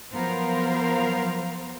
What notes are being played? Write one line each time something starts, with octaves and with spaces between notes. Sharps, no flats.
F3 F#3 B3 A#4 C5 F5